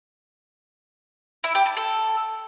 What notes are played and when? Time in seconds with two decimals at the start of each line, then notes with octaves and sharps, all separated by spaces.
1.44 E4
1.55 G4
1.66 A5
1.77 A4